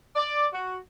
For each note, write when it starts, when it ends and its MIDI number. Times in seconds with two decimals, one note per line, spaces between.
0.16 0.47 74
0.53 0.77 66